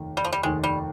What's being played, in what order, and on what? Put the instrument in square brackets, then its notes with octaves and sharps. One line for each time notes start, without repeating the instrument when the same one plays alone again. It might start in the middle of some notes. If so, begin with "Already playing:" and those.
Already playing: [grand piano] F1 D#2 D#3
[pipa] G3
F3
G3
[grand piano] F1 D#2 D#3 [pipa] G#3
[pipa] G3